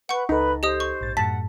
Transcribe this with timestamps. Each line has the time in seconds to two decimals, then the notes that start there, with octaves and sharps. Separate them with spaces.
0.09 B4 F#5 C#6
0.29 C#2 D#4 A4 B4
0.63 G4 C5 D#5 D#6
0.80 C#6
1.01 A#1 G#2 A6
1.17 F#2 A2 F#5 A5 B6